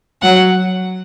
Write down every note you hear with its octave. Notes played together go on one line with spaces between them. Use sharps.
F#3 F#5